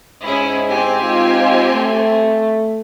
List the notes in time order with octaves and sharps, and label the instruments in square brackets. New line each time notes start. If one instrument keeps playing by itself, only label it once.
[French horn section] G#2 [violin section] C#4 E4 G#4
[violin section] C4 G4 G#5
[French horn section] G#3 D#4 F4
A3